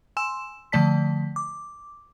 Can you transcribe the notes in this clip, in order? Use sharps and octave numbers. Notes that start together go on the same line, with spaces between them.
G#5 C6 E6 E7
D3 F3 A3 D5 A5 B6
D6